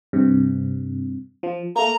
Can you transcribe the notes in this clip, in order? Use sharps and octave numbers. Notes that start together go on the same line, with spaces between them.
G2 C3
F3
A3 A#3 A#5